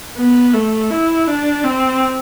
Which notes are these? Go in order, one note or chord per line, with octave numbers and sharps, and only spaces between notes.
B3
A3
E4
D4
C4